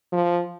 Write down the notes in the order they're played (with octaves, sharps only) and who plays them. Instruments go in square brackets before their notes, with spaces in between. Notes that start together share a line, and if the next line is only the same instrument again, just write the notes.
[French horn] F3